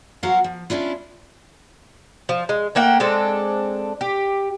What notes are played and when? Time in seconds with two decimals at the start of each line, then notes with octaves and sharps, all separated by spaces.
0.23 F#3 F#4 A#4 C5 F5 F#5
0.44 F3
0.70 C#4 D4 E4 F4
2.29 F3
2.49 G#3
2.75 A3 A#3 F#5 G5
3.00 G#3 C4 D4 A4
4.01 G4